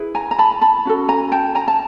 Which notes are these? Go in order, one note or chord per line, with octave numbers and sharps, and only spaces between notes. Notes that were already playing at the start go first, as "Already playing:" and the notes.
Already playing: E4 G#4 B4
G#5 A#5
A#5
A5 B5
A5 B5
C#4 F#4 A4
G#5 A#5
G5 A5
G#5 A#5
A5